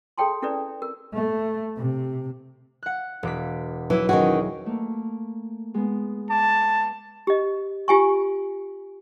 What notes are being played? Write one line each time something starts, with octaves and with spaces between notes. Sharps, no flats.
G#4 A4 C#5 G5 A5 C6
C#4 E4 A4 B4 D5
A#4
A3
C3
F#5 F#6
E1 D6 B6
E3 F#3 E4
D#3 C#4 F#4 G#4
A3 A#3
G#3 B3
A5 D6
G4 D#5
F4 G4 G#5 C#6